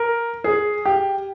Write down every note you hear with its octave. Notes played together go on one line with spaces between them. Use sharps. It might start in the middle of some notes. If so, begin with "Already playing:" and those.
Already playing: A#4
G#4
G4